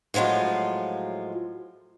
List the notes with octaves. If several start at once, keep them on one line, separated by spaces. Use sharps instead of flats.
A2 F3 F#3 G#3 F4